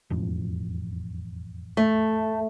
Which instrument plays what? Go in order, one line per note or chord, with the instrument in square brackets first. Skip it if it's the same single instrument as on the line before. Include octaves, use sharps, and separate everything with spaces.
[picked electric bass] E1 A1 F2
[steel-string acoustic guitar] A3